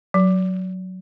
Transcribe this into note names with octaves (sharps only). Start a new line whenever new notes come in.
F#3